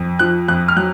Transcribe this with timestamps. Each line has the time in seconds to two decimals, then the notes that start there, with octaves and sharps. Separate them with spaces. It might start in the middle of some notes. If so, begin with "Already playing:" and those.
Already playing: F2
0.19 F3 F#6
0.48 F2 F#6
0.68 F6
0.76 F#3 F#6